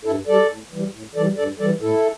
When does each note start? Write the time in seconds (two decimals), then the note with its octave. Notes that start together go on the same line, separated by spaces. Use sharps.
0.05 G2 E4 A4
0.27 G3 A4 D5
0.49 A2
0.72 E3 G3
0.93 A2
1.15 E3 A4 D5
1.18 G3
1.37 G2 A4 D5
1.59 E3 G3 A4 D5
1.81 A2 E4 A4